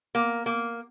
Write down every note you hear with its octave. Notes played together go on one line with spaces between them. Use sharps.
A#3
A#3